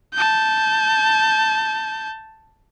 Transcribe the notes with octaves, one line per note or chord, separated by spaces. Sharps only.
A5 G6